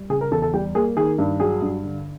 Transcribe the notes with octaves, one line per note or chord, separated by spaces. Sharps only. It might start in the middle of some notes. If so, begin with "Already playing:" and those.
Already playing: G3
C#3 G#4
A#4
E2 A4
A4
G3 G4
A#3 G#4
D#3 G#4
G2
F#3 G#4
G2
D3